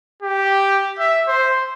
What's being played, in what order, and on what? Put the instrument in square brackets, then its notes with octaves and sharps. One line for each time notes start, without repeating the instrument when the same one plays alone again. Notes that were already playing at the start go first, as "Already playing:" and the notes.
[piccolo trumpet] G4
E5
C5